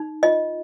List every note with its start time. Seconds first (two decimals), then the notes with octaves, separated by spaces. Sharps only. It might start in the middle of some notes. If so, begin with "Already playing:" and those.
Already playing: D#4
0.23 F4 D#5